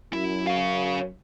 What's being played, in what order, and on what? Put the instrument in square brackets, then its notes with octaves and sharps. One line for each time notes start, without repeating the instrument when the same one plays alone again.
[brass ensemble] F#2 [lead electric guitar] E4
[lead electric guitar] C#4 F5